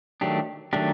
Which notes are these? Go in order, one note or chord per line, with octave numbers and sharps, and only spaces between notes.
D#3 F#3 A3 D4 G4
D#3 F#3 A3 D4 G4